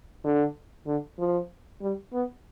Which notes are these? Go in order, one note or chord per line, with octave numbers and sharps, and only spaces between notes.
D3
D3
F3
G3
B3